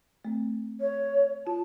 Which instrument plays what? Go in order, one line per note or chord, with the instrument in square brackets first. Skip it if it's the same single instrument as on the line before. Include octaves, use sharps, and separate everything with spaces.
[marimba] A3 C4
[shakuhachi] C#5
[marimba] F4 [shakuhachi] A5